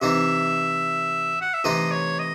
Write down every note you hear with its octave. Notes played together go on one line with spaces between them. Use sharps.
C3 E3 C4 D#4 E5
F#5
E5
C3 E3 A3 C4 D#4 D#5
C#5
D#5